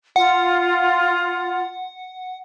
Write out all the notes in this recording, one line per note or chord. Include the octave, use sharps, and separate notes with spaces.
F4 F#5